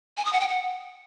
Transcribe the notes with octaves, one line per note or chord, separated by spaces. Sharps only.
G#5
D#6
F#5
G5
F#5